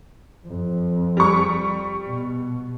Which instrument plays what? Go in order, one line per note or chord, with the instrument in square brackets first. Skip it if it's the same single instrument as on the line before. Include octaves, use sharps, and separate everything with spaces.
[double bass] F2
[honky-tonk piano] G3 C#6
[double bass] B2